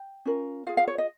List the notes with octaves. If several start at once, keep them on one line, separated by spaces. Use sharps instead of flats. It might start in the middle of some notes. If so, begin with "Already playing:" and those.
Already playing: G5
C#4 F4 A#4
F4 G#4 F5
F5
C#5
D#5